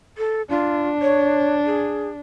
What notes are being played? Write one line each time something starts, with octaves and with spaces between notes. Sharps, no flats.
A4
D4 F4
C#5
G#4